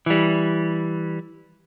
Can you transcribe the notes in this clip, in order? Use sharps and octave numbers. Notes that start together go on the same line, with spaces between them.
E3 G3